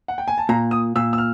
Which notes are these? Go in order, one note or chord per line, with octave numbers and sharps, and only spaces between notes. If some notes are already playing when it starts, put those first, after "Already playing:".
F#5
G5
G#5
A5
A#2 A#5
D#6
A#2 E6
E6
F6